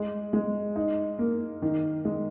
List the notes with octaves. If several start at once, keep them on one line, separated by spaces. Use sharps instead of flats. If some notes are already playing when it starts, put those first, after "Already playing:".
Already playing: G#3
G#3
D#4
A#3
D#3
G#3